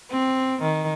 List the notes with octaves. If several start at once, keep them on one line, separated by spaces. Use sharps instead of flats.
C4
D#3